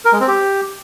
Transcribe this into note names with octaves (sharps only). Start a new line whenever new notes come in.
A#4
G#3
C4
G4